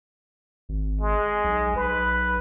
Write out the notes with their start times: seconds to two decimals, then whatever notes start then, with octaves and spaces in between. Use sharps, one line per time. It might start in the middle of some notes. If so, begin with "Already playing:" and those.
0.69 G#1
1.01 G#3
1.44 B1
1.76 B1 B4